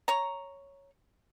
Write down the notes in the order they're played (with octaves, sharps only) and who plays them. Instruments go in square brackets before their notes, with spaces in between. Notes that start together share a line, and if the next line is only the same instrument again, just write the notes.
[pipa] C#5 A#5